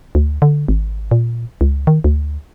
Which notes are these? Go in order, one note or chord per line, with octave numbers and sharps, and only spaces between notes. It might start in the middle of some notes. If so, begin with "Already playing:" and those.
D2
D3
G#1
A#2
C#2
D#3
D2